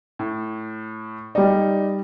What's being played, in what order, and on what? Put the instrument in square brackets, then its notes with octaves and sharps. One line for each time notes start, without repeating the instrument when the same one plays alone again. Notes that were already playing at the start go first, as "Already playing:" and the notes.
[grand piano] A2
[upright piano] G3 D5 [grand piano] D#4